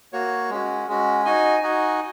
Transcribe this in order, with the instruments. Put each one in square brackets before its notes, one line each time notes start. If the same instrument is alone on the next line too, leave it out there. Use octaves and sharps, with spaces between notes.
[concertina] A#3 F#4 C#5
G#3 C#4 F#4
G#3 C#4 F#4
D#4 F#4 D#5 G#5
D#4 F#4 D#5 G#5